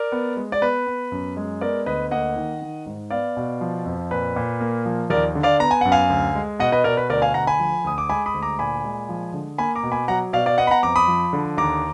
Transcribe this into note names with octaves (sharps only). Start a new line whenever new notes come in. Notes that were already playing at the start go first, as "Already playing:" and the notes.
Already playing: A#4 D5
B3
G#3
D5
B3 B4
B3
F#2
G#3
B3 A#4 D5
D2 B4 D#5
A#3 D#5 F#5
D#3
D#3
G#2
B3 D5 F5
B2
F3
F2
A#2 B4
A#2
A#3
F3
D#2 A#4 D5
D3
D5 F5
B3 A#5
G#5
F#2 F#5
F5 G#5
D2
G#3
B2 D#5 F#5
B4 D#5
B2 A#4 D5
B4
D2 A#4 D5
F5 G#5
D2 F#5 A#5
G#5 B5
F3
D2 D#6
D6
G#3 G#5 B5
B5 D#6
D2
A#5 D6
A#2 G#5 B5
G#3
F3
D3
A#3 G#5 B5
A#5 D6
B2
G#5 B5
F#3 F#5 A#5
B2 D5 F5
D5 F5
B3 D#5 F#5
B5
F#5 A#5
F2 A#5 D6
B5 D#6
F3
D3
D#2 A#5 D6